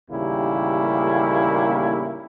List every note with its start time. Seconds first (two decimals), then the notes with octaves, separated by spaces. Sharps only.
0.10 A1 D#2 C#3 G3 A#3 E4